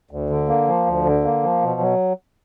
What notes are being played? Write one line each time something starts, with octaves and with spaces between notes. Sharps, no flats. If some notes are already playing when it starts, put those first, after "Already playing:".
D2
D3
A#3
F3
D2
D3
A#3
F3
B2
F#3